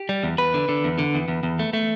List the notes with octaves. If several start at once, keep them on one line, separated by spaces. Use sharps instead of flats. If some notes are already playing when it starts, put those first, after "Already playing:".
Already playing: G4
G3
E2
E2 B4
D3
D3
E2
D3
E2
E2
E2
A3
A3